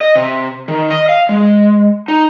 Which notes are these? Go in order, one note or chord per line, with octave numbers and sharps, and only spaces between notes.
D#5
C3
D#3
D#5
F5
G#3
D#4